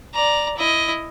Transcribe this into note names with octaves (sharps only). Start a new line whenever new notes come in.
D5 A#5
E4 D#5